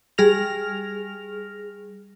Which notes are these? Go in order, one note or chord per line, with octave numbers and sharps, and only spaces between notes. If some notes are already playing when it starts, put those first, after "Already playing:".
G3 G#4 F6 A#6 F7